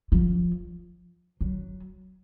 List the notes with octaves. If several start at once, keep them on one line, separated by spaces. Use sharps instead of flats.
F3
F#3